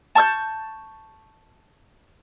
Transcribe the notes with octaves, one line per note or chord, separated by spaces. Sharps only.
A5 C#6 E6 G6